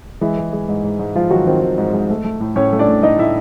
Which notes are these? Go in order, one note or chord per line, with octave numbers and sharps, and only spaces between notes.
E3 G#3 E4
G#3
G#3
G#2
G#2
G#2
G#2 F3 F4
D#3 F#3 F#4
D#3 C4 C5
D#3
G#2
G#3
A3
A3
A2
A2 C#4 C#5
A3
D4 D5
A2
A2 D#4 D#5
A2 E4 E5